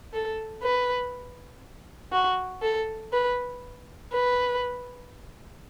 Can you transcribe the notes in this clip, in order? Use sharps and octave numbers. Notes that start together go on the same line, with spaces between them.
A4
B4
F#4
A4
B4
B4